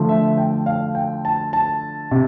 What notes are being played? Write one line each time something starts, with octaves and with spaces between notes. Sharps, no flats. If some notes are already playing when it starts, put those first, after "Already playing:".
Already playing: D3 F3 A3
E5
G5
F5
G5
A5
A5
C3